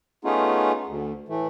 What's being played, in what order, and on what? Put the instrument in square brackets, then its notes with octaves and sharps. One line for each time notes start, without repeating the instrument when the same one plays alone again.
[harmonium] A3 B3 C#4 D#4 F4 G#4
D2
A2 E3 A3